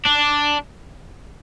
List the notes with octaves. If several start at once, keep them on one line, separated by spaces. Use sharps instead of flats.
D4